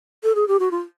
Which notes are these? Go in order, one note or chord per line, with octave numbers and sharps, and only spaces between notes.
A4
G#4
G4
F#4
F4